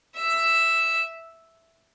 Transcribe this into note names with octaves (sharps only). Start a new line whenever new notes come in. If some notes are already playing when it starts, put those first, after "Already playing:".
E5